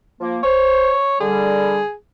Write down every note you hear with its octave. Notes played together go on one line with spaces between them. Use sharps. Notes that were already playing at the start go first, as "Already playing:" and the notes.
F3 A#3
C5 C#5
D3 G3 G#4